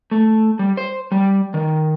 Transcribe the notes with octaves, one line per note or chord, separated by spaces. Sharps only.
A3
G3
C5
G3
D#3